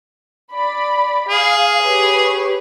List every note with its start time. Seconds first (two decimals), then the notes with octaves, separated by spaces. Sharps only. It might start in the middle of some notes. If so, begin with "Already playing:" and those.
0.54 D5 B5
1.29 G#4 F5
1.83 G4 B4 C#5